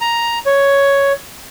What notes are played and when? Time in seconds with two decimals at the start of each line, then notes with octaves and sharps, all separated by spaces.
0.01 A#5
0.46 C#5